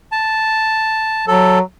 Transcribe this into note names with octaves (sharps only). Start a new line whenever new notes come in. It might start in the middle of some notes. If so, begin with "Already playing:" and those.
A5
F#3 A4